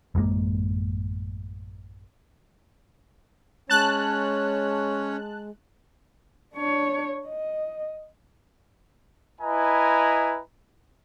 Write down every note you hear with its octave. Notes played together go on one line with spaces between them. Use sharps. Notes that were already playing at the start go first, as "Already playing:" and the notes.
A1 F#2 G#3 A#3
G#3 C#4 C#5 A5 F#6
D4 C#5
D#5
E4 B4 D#5 G#5 A#5